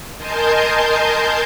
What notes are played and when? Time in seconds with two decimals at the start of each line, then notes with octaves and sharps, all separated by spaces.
0.17 A#4 D#5 G#5 A5 C6 G6